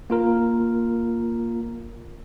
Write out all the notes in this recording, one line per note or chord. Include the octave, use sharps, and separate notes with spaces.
A#3 F4 A#4